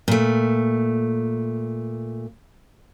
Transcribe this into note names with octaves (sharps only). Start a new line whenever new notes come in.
A#2 A3